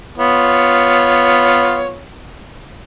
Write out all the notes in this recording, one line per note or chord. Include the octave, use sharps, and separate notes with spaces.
B3 F4 C#5